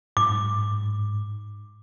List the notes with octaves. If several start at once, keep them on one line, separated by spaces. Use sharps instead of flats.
G#2 D6